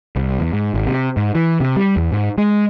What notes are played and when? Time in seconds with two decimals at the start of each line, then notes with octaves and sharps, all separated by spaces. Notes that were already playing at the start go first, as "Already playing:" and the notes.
0.16 C2
0.40 E2
0.53 G#2
0.74 G#1
0.87 C3
1.17 G#2
1.35 E3
1.60 C3
1.76 G3
1.96 E2
2.12 G#2
2.38 G#3